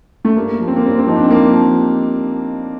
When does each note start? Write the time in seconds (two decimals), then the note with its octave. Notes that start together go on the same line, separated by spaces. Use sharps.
0.25 A3
0.36 G2 A#3
0.60 F3
0.68 C4
0.76 A#3
0.83 G2 C4
0.99 C4
1.06 F3 D#4
1.16 D4
1.23 C4
1.30 F3 A#3
1.53 F3